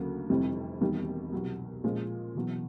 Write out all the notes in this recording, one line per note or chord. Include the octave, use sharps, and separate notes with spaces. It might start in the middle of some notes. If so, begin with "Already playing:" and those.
Already playing: D2 C#3 F#3 A#3
F1 F2 C3 E3 G3
E1 D#2 D#3 G3
C2 B2 F#3
A#2 F3 G#3 C#4 F4
E1 E2 B2 F#3